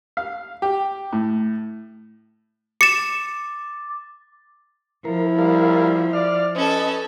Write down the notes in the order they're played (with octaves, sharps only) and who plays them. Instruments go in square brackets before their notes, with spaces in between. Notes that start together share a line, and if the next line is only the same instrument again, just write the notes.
[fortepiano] F5
G4
A2
[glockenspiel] D6 A6 [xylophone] C#7 E7
[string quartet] F3 [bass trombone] E4 [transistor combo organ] A#4
[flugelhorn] G3 [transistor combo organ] A#4 F5
[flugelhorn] D5 [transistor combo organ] F6
[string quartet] C#4 A4 [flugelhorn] B4 [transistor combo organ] D#5